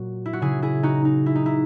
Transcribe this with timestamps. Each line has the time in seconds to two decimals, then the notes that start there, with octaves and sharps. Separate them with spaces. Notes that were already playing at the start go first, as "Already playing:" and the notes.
Already playing: A#2 F#3 F#4
0.26 E4
0.33 F#4
0.41 C#3 F#3 E4 G#4
0.62 E4 G#4
0.83 D#4 F#4
1.05 D#4
1.26 E4
1.35 D#4
1.46 E4